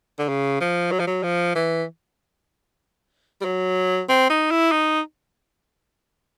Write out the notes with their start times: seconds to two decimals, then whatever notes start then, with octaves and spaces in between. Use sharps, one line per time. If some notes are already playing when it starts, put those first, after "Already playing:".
0.19 D3
0.29 C#3
0.61 F3
0.92 F#3
1.00 F3
1.07 F#3
1.23 F3
1.55 E3
3.41 G3
3.45 F#3
4.09 C4
4.30 D#4
4.51 E4
4.72 D#4